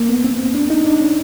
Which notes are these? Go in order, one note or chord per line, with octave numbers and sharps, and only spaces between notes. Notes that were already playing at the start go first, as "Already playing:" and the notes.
Already playing: A#3
B3
C4
D4
D#4
D4
C#4